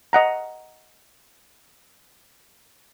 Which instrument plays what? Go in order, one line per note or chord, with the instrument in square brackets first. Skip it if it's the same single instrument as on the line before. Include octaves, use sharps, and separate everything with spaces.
[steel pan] D#5 F#5 A#5